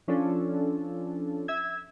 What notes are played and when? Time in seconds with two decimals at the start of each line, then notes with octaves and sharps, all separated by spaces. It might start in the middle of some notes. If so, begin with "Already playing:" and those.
0.08 F3 C#4 D4 F4 A4
1.48 E5 E6 G#6